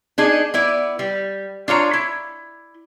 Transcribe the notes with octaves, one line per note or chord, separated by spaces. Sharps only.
D4 D#4 G#4
B3 E4 D5
G3
D4 F4 C#5 A#5
E4